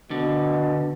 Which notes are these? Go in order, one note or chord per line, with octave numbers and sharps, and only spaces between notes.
B2 D3